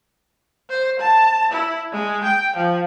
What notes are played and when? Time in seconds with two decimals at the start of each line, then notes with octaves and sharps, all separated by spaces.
0.70 C5
1.00 A5
1.52 E4
1.92 G#3
2.24 G5
2.56 F3